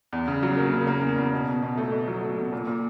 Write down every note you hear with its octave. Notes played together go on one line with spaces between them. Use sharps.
E2
C#3
F#3
A#3
C#3
A#3
E2
E2
B2
B2
B2
A3
B2
F#3
A3
B2
A#2
A#2